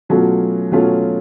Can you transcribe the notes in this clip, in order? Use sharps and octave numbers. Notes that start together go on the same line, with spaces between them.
B2 F#3 A3 C#4 F4
B2 F#3 A3 C#4 F4